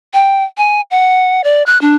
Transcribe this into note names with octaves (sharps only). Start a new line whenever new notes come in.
G5
G#5
F#5
D5
F#6
D4